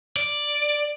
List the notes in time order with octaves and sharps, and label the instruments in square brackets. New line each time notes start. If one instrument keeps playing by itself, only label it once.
[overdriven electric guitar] D5